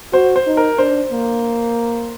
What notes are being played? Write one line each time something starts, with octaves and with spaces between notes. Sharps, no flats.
F#4 C5
C5
D#4
A#4
D4 C5
A#3